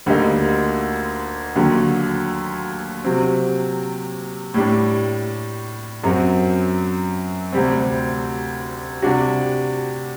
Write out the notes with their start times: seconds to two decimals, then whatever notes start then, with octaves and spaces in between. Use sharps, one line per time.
0.06 D2 D3 G3 A#3 D#4
1.56 D#2 D3 F#3
3.04 C3 F#3 C4
4.54 A2 G3 D4
6.04 F#2 F#3 C4 F#4
7.52 D2 C3 G3 C4
9.02 C3 G3 D4 F#4